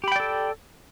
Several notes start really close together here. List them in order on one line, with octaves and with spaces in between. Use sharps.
G4 B5 G5 D5 A4